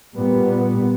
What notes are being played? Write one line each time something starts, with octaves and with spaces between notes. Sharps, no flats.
A#2 G3 B3